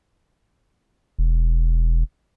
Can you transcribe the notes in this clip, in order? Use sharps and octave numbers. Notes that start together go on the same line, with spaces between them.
E1